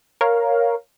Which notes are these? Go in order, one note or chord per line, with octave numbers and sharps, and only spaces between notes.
A#4 C#5 F5